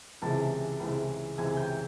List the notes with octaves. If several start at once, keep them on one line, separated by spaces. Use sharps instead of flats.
C#2 C3 E3 G#3 A5 A6
C#2 C3 E3 G#3
C#2 C3 E3 G#3 G#5 G#6
G5 G6